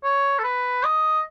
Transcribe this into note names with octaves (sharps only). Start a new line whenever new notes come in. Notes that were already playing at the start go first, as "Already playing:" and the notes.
C#5
A4
B4
D#5